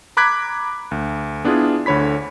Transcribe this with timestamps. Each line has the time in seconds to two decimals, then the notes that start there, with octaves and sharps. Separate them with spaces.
0.17 A#5 B5 D6 F#6 G#6 B6
0.91 D2
1.45 B3 D4 E4 F4 G#4
1.86 D2 D3 C#5 B5 B6